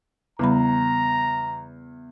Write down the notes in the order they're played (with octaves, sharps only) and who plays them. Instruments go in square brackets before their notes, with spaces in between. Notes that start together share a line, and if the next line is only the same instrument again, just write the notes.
[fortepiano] E2 [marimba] C#3 G3 B5 [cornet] A#5